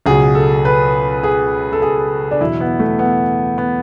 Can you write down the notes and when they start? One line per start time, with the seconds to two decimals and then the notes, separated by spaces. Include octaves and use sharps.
0.06 C#2 B2 F#3 G#4
0.35 A4
0.65 B4
1.23 G#4
1.73 A4
1.82 G#4
2.31 D4
2.40 E2 B2 F#3 E4
2.60 B3
2.80 A3
2.99 B3
3.58 B3